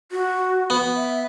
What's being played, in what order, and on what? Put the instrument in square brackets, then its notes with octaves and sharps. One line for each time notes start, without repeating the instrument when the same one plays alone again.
[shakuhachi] F#4
[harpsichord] B3
[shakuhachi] E5